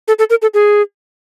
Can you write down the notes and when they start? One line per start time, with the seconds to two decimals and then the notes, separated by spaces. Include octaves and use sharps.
0.08 A4
0.19 A4
0.30 A#4
0.42 A4
0.54 G#4